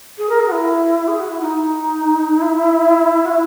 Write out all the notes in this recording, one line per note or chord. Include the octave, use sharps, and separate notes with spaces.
G#4
A#4
G#4
F#4
E4
G#4
F#4
E4
D#4
E4
F#4
E4